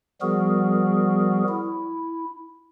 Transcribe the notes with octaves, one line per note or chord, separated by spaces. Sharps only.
F3 G3 B3 F#4 G#4 A#4
E4